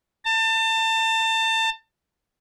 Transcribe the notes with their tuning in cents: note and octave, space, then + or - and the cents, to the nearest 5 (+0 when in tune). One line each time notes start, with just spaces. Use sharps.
A5 +30